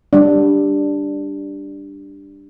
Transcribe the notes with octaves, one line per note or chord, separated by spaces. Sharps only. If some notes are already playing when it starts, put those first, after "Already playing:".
G3 D4